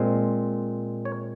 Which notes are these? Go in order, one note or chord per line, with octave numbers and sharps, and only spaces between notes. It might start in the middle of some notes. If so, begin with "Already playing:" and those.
Already playing: A#2 G#3 C4
C#5